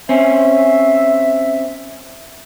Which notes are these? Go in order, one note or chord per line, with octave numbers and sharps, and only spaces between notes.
C4 C#4 E5